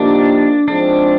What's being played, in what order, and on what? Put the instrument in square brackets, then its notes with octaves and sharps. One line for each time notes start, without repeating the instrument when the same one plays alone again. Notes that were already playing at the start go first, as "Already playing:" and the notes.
Already playing: [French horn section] F3 A#3 D#4 G4 [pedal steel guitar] D4
[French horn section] G#2 F3 G#3 C4 [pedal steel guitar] D4